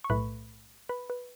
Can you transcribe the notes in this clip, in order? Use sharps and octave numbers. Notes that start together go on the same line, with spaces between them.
C#6
B1 A2 A3 B4 B5
B4 B5
B4